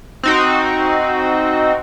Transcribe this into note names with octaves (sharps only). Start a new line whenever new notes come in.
C4 D#4 F#4